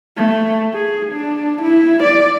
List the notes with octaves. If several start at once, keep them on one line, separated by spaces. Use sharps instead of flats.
A3
G#4
D4
E4
D5